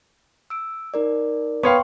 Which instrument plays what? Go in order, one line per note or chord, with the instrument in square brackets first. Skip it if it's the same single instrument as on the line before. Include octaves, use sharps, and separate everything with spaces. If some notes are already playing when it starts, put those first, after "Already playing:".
[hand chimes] E6 D7
D#4 A#4 D5
[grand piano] B3 C#5 F5 [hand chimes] G5 C6 C#6